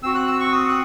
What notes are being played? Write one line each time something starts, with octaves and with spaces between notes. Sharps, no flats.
C4 F#4 E6
F#6
E6
C#6
D#6
F#6